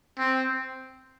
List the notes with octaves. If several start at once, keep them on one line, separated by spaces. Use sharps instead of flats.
C4